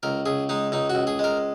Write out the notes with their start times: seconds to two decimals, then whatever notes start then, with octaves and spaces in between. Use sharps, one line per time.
0.03 C#2 A#4
0.26 C#2 G#4
0.49 G#3 D#4
0.72 C#2 D#4
0.90 F#4
0.95 C#2
1.07 G#4
1.19 G#3 A#4